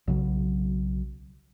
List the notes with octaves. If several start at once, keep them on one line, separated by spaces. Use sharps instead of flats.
B1 C#3 F#3